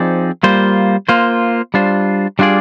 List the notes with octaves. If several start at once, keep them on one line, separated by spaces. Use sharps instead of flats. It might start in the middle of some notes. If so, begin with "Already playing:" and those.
Already playing: F3 C4 D#4 G#4 D5
G3 A#3 F4 C5
A#3 F4 C5
G3 D4 F4 C5
G3 D4 F4 G#4 D5